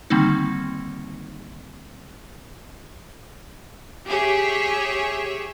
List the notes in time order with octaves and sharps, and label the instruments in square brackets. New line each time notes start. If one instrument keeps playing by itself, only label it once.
[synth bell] D3 D#3 G3 A#3 C4 D#4
[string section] G4 G#4 C#5 E5